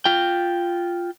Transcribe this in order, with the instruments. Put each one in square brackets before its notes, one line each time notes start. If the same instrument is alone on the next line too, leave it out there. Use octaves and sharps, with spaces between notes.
[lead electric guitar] F4 G5